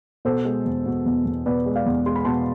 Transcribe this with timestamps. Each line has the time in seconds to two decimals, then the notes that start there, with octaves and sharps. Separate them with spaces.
0.25 B2 A4 C5
0.45 G#3
0.66 E2
0.86 B2
1.06 E2
1.25 E2
1.46 B2 B4 D5
1.66 G#3
1.76 D5 F5
1.86 E2
2.06 G#3 C6
2.15 B5
2.25 B2 A5 C6